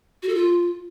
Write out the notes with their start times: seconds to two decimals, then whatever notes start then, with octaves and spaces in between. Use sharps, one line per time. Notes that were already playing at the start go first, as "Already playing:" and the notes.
0.23 F#4
0.29 A4
0.35 F4